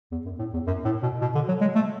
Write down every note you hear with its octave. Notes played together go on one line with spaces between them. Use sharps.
E2
F#2
A2
E2
F#2
A2
B2
B2
D3
F#3
G#3
A3